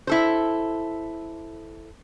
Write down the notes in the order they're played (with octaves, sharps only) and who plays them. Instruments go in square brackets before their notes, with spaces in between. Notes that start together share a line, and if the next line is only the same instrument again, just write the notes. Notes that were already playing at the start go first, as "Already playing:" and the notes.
[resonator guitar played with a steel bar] E4 A4 C5